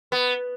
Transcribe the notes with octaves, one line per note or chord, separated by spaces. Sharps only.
B3